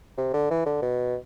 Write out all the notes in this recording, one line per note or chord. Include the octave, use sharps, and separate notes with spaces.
C3
D3
E3
D3
B2